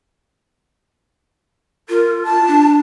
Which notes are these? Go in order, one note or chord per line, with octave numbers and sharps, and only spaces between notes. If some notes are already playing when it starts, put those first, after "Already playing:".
F4 A#4
A5
D4